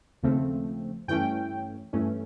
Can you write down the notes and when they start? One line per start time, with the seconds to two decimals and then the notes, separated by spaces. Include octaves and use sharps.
0.23 D#2 C#3 F3 A3 C4
1.08 G2 E3 A3 C#4 G5
1.93 G2 E3 A3 C#4